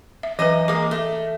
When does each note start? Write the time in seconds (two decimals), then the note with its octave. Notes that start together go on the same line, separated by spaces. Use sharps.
0.23 E5
0.39 F#2 E3 B4 D#5
0.68 G#3 A#3 D6
0.91 A3